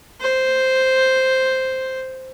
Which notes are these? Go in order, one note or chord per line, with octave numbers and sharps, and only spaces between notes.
C5